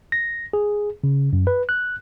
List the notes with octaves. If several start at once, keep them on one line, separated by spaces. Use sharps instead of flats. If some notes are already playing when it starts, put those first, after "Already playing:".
A#6
G#4
C#3
F#2
B4
F#6